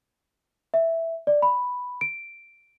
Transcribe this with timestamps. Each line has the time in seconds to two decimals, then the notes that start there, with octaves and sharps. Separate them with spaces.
0.74 E5
1.27 D5
1.42 B5
2.01 D7